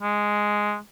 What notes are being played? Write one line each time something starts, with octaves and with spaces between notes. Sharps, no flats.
G#3